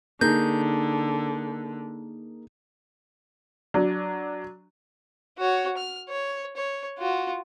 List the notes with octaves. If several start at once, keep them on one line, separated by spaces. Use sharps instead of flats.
D3 A#3 D#4 G#4 G6
F#3 D4
F#4 C#5
F6
C#5
C#5
F4 F#4